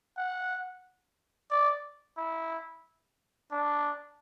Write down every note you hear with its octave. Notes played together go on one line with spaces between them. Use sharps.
F#5
D5
E4
D4